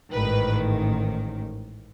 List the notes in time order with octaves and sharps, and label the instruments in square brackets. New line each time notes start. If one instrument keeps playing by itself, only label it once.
[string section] A1 G#2 D#3 B4